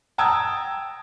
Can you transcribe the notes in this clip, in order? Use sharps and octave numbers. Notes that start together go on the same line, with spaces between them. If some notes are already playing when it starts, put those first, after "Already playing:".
G5 A5 A#5 D#6 E6 G#6